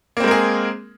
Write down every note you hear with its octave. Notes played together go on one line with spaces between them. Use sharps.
G#3 A#3 C4 G#4 A#4